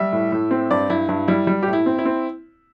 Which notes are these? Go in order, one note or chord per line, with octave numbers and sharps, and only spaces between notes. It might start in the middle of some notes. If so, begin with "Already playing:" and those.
Already playing: G3 E5
A2
A2
C4
G2 D5
G2 E4
G2 E4
G3 E4
G3
A2 G4
E4
C4
E4
C4